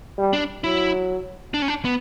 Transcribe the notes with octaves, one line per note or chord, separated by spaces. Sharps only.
G3
D4
F#3 E4
D4
C#4
D4
B3